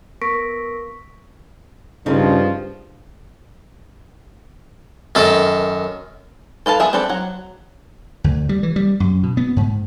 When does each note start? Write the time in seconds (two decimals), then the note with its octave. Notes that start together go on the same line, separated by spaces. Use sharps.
0.22 B3 A#4 C#6 A#6 B6 D7
2.06 G2 C#3 F3 D#4 G#4
5.15 F#2 D#3 A4
6.66 A4 B4 F5 A5
6.80 B3 G#4 E5
6.93 C4 D4 A4 B4 D5
7.09 F#3 F#5
8.24 D2
8.49 G3
8.63 E3
8.76 G3
9.00 F#2
9.23 B2
9.37 B3
9.57 G#2